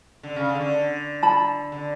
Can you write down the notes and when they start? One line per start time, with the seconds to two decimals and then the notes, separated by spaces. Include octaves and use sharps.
0.23 D3
0.36 C#3
0.49 D3
0.61 D3
1.22 A5 B5
1.72 D3